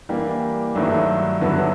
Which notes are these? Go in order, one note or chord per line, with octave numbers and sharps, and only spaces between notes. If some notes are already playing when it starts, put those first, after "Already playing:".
E3 G3 A#3 D4 G4
G2 D#3 F#3 A3 D4
G2 D3 F#3 B3 E4